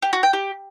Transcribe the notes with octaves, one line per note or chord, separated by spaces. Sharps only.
G4
F#4
G5
G4